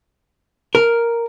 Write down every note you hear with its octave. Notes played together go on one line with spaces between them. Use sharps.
A#4